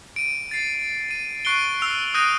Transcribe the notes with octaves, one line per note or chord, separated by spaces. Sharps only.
D7 D#7
A6 C7
D#7
C#6 F#6 C7 D7 G7
E6 F6 C7 F7
D#6 F#6 G6 A#6 D7 D#7